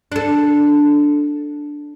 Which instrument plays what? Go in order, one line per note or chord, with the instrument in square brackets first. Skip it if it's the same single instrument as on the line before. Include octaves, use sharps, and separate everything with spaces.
[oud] D4 A4